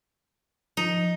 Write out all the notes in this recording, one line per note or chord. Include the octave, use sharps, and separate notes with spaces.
F3 D#4